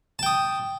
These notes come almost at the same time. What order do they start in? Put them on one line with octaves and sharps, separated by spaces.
A5 G5 D#6